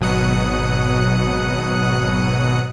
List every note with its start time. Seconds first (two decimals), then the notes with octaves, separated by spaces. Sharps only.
0.01 G#1 B2 F#3 D#6 F#6 C#7